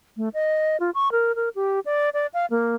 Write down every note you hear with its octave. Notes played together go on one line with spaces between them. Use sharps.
A3
D#5
F4
C#6
A#4
A#4
G4
D5
D5
F5
A#3